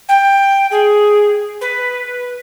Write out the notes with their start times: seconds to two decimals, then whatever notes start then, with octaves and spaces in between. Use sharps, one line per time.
0.09 G5
0.71 G#4
1.61 B4